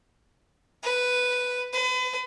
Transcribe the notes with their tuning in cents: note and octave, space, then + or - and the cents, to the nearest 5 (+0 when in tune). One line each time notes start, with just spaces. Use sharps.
B4 +5
B4 +40